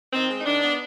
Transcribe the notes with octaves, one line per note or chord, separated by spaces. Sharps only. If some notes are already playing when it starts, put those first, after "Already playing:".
D#3 C4
G#3 C4
D#4
D#3 D4
B3